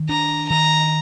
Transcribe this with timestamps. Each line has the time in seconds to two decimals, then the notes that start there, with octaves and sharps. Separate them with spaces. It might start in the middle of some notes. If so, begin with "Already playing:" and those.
Already playing: D#3
0.09 D4 A#5
0.50 D#3 A#5